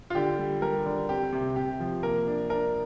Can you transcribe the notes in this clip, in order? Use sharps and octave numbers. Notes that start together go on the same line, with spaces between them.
F4
D3 G4
G3
G3 A#4
D3
C4 G4
C3
C3 G4
F3
A#3 A#4
D4
D4 A#4